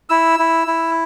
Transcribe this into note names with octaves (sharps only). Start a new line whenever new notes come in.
E4 E6
E4
E4